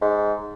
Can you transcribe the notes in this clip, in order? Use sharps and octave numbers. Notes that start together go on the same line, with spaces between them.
G#2